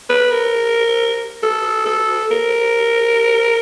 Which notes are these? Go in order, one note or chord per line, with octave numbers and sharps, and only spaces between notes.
B4
A#4
A4
A4
A#4